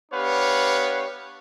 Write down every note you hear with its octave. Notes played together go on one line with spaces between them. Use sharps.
B3 D4 G4 B4 C#5 F5